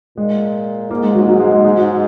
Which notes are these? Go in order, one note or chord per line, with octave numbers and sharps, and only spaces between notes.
A#2 G#3
G#2 A#3
G#3
F#3
G#2 F#3
G#3
G#3
G#2 G#3
F#3